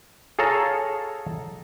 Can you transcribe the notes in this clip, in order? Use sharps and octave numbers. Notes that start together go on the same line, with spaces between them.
G#4 A4 C#5 F5 A5 A#5